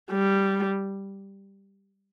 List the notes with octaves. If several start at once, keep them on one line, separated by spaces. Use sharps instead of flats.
G3